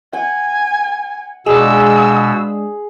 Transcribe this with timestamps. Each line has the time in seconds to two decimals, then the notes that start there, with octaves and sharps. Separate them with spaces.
0.13 F#5 G#5
1.46 B2 G#3 D4 F4 G#4 E6